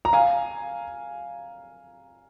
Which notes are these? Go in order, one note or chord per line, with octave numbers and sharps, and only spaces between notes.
A#5
F5 G#5